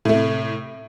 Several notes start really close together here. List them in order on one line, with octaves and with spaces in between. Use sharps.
A2 A3 C3